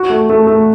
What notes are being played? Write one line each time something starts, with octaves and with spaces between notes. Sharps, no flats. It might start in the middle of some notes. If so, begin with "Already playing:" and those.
Already playing: F#4
A3
A3
A3